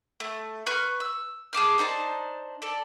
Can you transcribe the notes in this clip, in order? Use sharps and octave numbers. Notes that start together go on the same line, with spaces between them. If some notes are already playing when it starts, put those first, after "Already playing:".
A3
B4 C#6 F6
E6
G#4 A5 D6 F6
D4 D#4 C5 A5
A4 D5